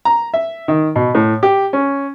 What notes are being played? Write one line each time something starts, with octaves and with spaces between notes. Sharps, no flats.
A#5
E5
D#3
B2
A2
G4
C#4